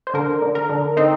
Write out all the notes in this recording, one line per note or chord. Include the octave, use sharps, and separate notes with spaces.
C5
D3 A#4
D3
A#4
D3
C4 D#4